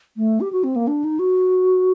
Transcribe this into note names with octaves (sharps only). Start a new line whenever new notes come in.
A3
G4
F#4
C4
A#3
D4
D#4
F#4